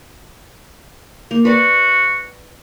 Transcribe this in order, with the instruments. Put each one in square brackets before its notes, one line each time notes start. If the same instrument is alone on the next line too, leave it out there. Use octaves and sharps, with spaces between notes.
[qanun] A#3
[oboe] F#4 [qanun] B4 D5